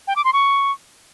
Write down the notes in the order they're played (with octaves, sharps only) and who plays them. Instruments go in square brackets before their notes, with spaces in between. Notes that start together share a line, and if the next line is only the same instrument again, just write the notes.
[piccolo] G5
D6
C6
C#6